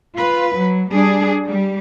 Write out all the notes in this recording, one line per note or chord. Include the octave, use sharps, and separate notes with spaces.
F4 B4
F#3
G3 D4 G#4
G3